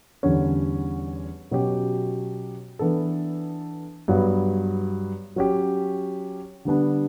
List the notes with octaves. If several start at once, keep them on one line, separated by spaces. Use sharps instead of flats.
E2 D3 G3 C#4
B2 F#3 C#4 G4
E3 B3 D4 A4
G2 F#3 B3
F#3 C#4 G4
D3 G3 B3 D4